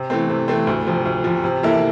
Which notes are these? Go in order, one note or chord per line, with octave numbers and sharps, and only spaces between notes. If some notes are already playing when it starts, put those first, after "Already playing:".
Already playing: C3
E3 A3 C4
C3
E3 A3 C4
D2
C3 F3
D2
C3 F3
C3
E3 A#3 E4 A4